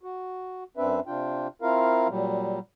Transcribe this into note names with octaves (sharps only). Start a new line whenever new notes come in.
F#4
F#2 C4 D4 B4 E5
C3 D4 F4 G5
C4 E4 F4 A#4 F5
A#2 F#3 G3